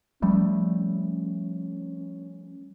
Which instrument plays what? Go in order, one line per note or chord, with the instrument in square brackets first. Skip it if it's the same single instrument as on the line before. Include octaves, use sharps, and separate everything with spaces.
[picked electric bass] F3 G3 A3 [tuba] C#4